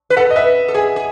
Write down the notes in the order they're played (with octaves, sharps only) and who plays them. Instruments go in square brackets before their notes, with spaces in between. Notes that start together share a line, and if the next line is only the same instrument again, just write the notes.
[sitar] B4
[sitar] A4 [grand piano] F#5
[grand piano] D#5
[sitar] B4 [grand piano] E5
[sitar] A4
[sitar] G#4 [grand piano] G#5
[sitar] G#4